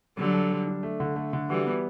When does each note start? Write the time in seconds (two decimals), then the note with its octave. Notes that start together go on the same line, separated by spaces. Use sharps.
0.17 D3 F#3 G3
0.34 A4
0.50 G3
0.67 D4
0.83 A3
1.00 D3
1.16 A3
1.33 D3
1.49 E3 G3 F#4
1.66 B3